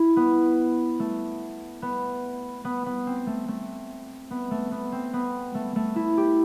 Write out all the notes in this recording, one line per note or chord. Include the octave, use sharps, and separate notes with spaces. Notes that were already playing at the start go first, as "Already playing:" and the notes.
Already playing: E4
B3
A3
B3
B3
B3
C4
A3
A3
B3
A3
B3
C4
B3
A3
A3
E4
G4